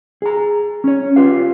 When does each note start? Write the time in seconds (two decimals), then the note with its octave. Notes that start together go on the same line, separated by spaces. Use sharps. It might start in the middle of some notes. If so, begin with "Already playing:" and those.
0.22 G#4 A#5
0.84 C#4 C#5
1.16 F4 G4 B4 F5